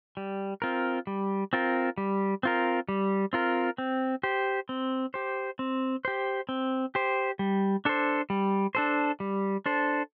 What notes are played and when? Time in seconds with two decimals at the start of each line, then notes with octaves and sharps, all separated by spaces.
0.17 G3
0.62 C4 F4 A#4
1.07 G3
1.53 C4 F4 A#4
1.98 G3
2.43 C4 F4 A#4
2.89 G3
3.33 C4 F4 A#4
3.78 C4
4.23 G4 C5
4.69 C4
5.14 G4 C5
5.59 C4
6.05 G4 C5
6.49 C4
6.95 G4 C5
7.39 G3
7.85 D4 A4 C5
8.30 G3
8.75 D4 A4 C5
9.20 G3
9.66 D4 A4 C5